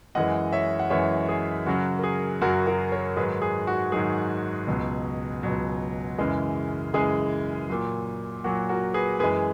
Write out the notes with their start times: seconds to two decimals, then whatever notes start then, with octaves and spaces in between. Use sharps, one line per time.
0.15 F#2 E3 G#3 D#5 F#5
0.53 C#5 E5
0.79 F#5
0.90 F#2 E3 G#3 C#5 E5
1.29 G#4
1.66 F#2 C#3 F#3 F#4
1.99 A#4
2.04 G#4
2.41 F#2 C#3 F#3 F#4 A#4
2.67 F#4 A#4
2.92 A#4 C#5
3.17 G#2 D#3 F#3 G#4 B4
3.42 G#4
3.67 F#4
3.92 G#2 D#3 F#3 G#4
4.67 C#2 B2 F#3
5.43 C#2 B2 F#3
6.19 F#2 C#3 E3 G#3
6.94 F#2 C#3 E3 G#3 G#4
7.69 A#2 F#3
8.44 A#2 F#3 F#4
8.69 F#4 A#4
8.94 G#4 B4
9.19 F#2 E3 G#3 G#4 B4